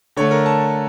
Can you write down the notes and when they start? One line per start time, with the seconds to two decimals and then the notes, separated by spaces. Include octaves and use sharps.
0.16 D3 A3 C#5
0.31 A#4
0.46 A5